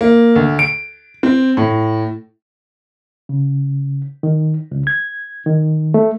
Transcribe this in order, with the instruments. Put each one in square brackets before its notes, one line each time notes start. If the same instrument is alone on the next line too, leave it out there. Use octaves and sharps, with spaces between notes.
[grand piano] A#3
D2
D7
C4
A2
[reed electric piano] C#3
D#3
C#2
G#6
D#3
A3